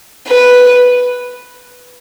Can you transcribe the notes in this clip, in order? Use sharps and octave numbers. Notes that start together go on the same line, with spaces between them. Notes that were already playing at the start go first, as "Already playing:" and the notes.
B4